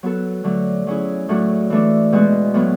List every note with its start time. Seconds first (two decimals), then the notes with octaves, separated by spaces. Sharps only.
0.03 F#3 B3 F#4 A4
0.44 D3 F#3 A3
0.87 F#3 C#4 E4 G#4
1.29 A2 F#3 A3 D4 F#4
1.70 E3 A3 D4
2.13 B2 G#3 B3 F#4
2.54 A2 F#3 B3